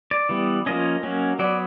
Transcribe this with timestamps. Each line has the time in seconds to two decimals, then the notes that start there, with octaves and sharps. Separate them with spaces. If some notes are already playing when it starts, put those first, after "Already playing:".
0.11 D5
0.29 E3 G3 B3
0.66 F3 A#3 C#4 D#5
1.03 F#3 A#3 C#4
1.39 F#3 B3 D5